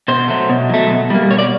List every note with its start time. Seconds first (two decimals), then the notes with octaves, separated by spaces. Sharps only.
0.08 B2 C5
0.28 F#3 A3
0.50 B2
0.70 F#3 A3
0.90 B2
1.10 G3 A#3
1.30 B2 C#5
1.38 D5